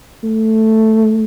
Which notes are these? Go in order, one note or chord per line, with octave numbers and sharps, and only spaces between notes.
A3